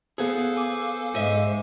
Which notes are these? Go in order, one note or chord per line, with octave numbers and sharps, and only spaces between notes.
B3 G#4 A4 C5 F5
G#5 D6
G#2 G#3 D#5 E5 D#7